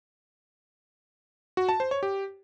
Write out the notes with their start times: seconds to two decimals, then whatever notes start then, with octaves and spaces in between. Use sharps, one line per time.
1.57 F#4
1.69 A5
1.80 C5
1.91 C#5
2.03 G4